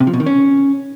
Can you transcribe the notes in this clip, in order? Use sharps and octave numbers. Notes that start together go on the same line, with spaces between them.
C3
F3
B2
D#3
C#4